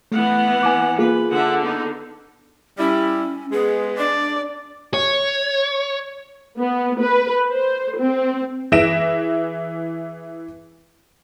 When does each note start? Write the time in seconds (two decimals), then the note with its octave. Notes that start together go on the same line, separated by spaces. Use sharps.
0.12 E3 A3 B3 F#5
0.63 G#5 D6
0.99 A#3 F4 G#4 B4
1.31 D3 E5 F#5
1.62 B3 D#4
2.78 G3 C#4 E4
3.52 G#3 B3 G#4
3.98 D4 D5
4.94 C#5
6.59 B3
7.00 B4
7.52 C5
7.98 C4
8.72 E3 G#4 E5 A#6 D7 E7